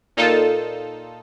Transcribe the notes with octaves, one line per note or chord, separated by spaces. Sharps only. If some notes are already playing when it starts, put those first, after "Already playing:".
A#2 D#4 F4 A4